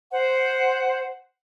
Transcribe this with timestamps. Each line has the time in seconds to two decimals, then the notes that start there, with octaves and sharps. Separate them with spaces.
0.12 C5 F#5